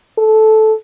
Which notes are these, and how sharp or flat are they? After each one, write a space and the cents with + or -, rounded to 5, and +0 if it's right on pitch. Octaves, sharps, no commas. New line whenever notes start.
A4 -10